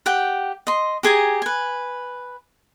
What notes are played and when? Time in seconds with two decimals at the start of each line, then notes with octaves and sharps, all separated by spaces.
0.06 G4 F#5 G5
0.67 D#5 C6
1.03 G4 G#4 G#5 A#5
1.42 B4 G#5